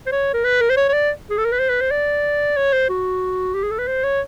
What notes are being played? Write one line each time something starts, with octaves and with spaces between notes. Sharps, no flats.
C5
C#5
A#4
B4
A#4
C5
C#5
C#5
D5
G#4
A4
A#4
B4
C5
B4
C5
D5
C#5
C5
F#4
G4
G#4
A4
B4
C5
C#5